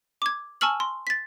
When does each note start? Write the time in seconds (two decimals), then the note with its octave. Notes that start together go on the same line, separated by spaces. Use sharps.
0.22 D6 G#6
0.61 G#5 A5 C#6 E6 F6 F#7
0.80 C6
1.07 A6 B6